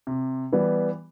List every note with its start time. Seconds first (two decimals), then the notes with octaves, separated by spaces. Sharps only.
0.07 C3
0.53 E3 G3 B3